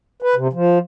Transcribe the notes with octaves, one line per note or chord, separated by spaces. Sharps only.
B4
C3
F3